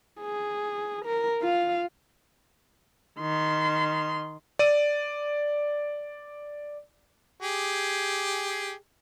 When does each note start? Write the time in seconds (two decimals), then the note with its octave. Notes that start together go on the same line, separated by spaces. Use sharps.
0.21 G#4
1.05 A#4
1.41 F4 F5
3.19 D#3 C6
4.59 D5 D#7
7.41 G4 G#4